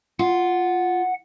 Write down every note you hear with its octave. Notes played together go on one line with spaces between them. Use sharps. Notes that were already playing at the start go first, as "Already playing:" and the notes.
F4 F#5